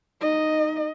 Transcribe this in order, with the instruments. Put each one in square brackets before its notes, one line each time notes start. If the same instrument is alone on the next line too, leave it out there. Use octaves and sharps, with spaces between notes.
[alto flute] D#4 [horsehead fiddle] D#5